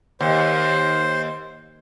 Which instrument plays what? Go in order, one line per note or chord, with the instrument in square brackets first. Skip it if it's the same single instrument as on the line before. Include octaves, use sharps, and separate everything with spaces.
[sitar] D#2 [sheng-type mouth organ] C5